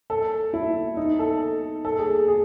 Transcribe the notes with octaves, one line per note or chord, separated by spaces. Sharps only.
A4
E4
D#4
A4
A4
G#4
G#4